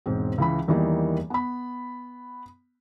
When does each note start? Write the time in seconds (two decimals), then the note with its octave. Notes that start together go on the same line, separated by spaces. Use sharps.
0.06 E1 G#2 C4
0.38 C#2 E3 B5
0.67 E2 D#3 E3 G3 A#3 D#4
1.30 B3 B5